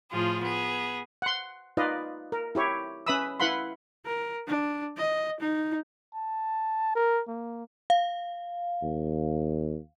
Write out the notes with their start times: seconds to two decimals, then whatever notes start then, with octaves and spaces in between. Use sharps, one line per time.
0.10 A2 F3 F4 G#4
0.42 B3 G#4
1.22 F#5 C6
1.77 D#4 F4 B4 D5 D#5 F5
2.32 A#4
2.55 E4 G4 C#5
3.07 C#4 B4 E5 B5 D#6 E6
3.40 E4 B4 F5 F#5 B5 C6
4.06 A#4
4.47 D4
4.97 D#5
5.40 D#4
6.14 A5
6.95 A#4
7.28 A#3
7.90 F5
8.83 D#2